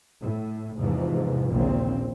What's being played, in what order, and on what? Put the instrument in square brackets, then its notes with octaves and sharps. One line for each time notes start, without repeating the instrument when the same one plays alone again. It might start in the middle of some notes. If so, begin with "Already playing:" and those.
[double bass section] A2
E2 G#2 C3 E3 F3
A#1 D#2 A#2 C#3 E3 C4